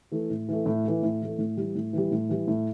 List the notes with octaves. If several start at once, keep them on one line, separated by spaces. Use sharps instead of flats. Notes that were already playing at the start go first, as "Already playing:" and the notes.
E3 A3
A2
E3 A3
A2
E3 A3
A2
E3 A3
A2
E3 G3
A2
E3 G3
A2
E3 G3
A2